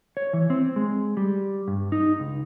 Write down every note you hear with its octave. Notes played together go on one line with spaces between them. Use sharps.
C#5
E3
C4
G#3
G3
G2
D#4
C#2